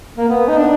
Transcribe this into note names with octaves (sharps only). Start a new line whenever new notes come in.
A#3
B3
D#4
D4